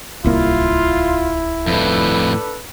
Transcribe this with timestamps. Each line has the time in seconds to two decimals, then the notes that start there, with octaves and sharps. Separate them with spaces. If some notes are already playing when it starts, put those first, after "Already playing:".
0.24 D1 C2 A#3 E4 F4
1.67 F2 A2 D4 A4 B4